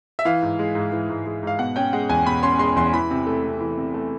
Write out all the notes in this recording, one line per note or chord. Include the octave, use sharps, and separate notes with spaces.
E5
E3 F5
G#2
G#3
G#2
E3
G#2
G#3
G#2 F5
B2 F#5
C#4 G5
G#3 F#5
E2 G#5
B2 B5
C#4 C6
G#3 C6
E2 C6
E3 B5
C3
A3
C3
E3
C3
A3